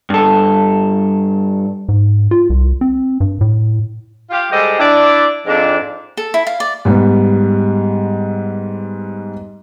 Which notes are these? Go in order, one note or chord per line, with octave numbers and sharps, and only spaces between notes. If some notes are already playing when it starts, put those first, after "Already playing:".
G2 A4
G#2
F4
C2
C4
G2
A2
F4 G4 F5
G3 G#3 G4 A4 C5 D#5
D4 E4 D5
F2 G#2 D4
A4
E4
F5
D5
G#2 G3 B3